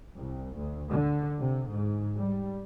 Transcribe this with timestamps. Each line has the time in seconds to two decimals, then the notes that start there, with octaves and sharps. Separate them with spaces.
0.16 C2
0.57 D2
0.90 D3
1.39 C3
1.68 G#2
2.16 G3